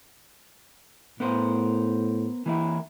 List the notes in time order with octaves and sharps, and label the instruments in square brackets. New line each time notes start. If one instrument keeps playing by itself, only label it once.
[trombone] A2 [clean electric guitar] B3 A#4 C5
[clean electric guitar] E3 A#3 E4